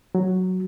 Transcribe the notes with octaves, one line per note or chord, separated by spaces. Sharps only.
F#3